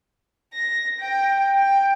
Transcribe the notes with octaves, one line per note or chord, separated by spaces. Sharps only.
A#6
G5
G5